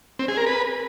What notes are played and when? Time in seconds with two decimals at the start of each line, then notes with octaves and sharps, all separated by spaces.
0.19 C4
0.28 G#4
0.37 A#4
0.46 B4